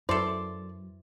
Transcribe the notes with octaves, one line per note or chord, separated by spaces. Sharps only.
F#2 E4 A4 C5 D5 C6